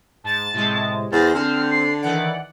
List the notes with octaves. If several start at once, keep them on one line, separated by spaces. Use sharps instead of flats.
G#2 A5 A6
A2 C3 G#3
E2 C5 A6 A#6
D3 C4 F6
C7
D#3 E3 D5 F#5